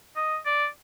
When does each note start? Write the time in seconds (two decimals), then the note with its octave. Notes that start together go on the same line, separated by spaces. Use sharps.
0.16 D#5
0.46 D5